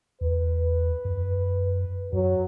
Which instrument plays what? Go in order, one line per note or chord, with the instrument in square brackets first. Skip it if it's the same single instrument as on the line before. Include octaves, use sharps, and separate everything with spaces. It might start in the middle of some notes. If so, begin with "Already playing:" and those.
[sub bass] E2 [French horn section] B4
[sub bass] F#2
[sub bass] F#2 [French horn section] F#3